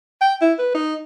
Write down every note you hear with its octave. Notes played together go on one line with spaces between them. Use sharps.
G5
E4
B4
D#4